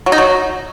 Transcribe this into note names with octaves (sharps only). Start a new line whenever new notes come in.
F#3
D#4
F#3